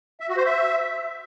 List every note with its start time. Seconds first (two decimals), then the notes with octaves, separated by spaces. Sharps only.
0.20 E5
0.29 F#4
0.37 C5
0.45 E5